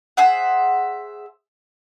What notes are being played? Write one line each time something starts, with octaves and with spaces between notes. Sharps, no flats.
G#4 C5 E5 F#5